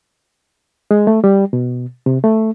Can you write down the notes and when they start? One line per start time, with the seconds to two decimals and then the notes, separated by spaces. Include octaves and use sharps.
0.91 G#3
1.07 A3
1.24 G3
1.53 B2
2.06 C3
2.24 A3